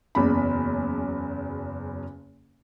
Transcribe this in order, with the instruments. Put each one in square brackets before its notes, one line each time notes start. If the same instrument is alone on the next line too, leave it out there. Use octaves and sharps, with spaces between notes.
[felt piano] F#1 E2 C#3 B5